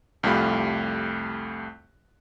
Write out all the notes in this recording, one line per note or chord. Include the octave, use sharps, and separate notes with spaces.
C2 F2 A3 F4 G4 B5